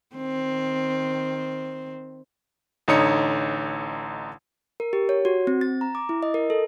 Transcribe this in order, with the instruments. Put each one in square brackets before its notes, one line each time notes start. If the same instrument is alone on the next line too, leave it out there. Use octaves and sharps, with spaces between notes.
[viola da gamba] D#3 C4
[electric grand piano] A1 D3 D#4 C#5 D#6 C#7
[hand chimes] A#4
G4
C#5
F#4
C4
A6
A#5
D6
E4
D#5
A#4
A4